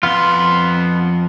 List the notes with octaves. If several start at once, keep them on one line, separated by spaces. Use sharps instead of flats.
F2 B3 F4 C6